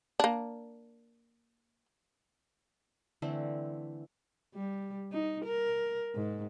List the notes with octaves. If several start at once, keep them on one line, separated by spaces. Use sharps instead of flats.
A#3 D4
D3 E3 A3 C4
G3
D#4
A#4
G#2